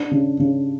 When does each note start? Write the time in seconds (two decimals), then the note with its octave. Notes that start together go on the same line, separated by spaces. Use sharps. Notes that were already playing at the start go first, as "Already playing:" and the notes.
Already playing: D4
0.11 C#3
0.39 C#3